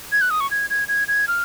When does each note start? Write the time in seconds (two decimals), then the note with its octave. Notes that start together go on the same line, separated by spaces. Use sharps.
0.12 G#6
0.21 F#6
0.30 D#6
0.40 C#6
0.51 G#6
0.70 G#6
0.88 G#6
1.08 G#6
1.28 F6